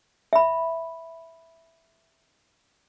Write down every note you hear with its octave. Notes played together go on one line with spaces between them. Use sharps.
E5 B5